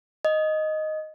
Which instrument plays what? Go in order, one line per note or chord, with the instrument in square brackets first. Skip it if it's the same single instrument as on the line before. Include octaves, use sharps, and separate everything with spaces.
[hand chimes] D#5